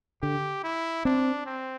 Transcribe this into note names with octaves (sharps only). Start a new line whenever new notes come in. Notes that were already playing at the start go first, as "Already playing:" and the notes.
D3 G4
E4
C4 D4
C4